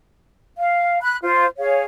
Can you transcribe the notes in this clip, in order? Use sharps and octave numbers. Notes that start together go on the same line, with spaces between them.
F5
B5 F#6
F4 C5
G#4 C#5 F5